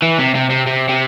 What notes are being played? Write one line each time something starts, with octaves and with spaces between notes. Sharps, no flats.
E3
C3
C3
C3
C3
C3